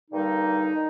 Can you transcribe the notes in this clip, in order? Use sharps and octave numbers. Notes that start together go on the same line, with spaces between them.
G2 D3 G3 A#3 D#4
D#3